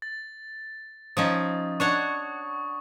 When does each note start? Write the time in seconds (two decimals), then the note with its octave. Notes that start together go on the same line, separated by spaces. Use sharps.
0.02 A6
1.17 F3 C#4 D#4 D#6
1.80 D4 C#5 F#5 C#6